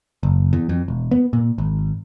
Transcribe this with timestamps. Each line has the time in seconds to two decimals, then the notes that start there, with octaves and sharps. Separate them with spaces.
0.23 F#1
0.53 E2
0.69 F2
0.88 E1
1.11 B3
1.33 A#2
1.58 G#1